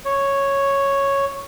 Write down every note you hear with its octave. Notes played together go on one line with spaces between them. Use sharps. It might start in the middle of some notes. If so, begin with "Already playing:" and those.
C#5